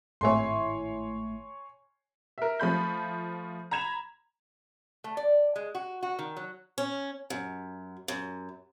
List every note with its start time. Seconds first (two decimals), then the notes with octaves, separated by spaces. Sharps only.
0.21 G#1 A2 E4 C#5 G#5 C6
2.38 A#4 E5
2.60 F3 A3 B5 G6
3.71 A#5 B5 G#6 E7 F7
5.04 A3
5.17 D5
5.56 G#3
5.75 F#4
6.03 F#4
6.19 D#3
6.37 F#3
6.78 C#4
7.30 F#2
8.08 F#2